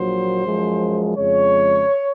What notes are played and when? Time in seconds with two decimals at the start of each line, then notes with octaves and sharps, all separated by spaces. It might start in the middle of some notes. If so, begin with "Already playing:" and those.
Already playing: A#1 A#2 F#3 C5
0.45 F#2 F3 G#3
1.17 F2 C#3 G#3 C#5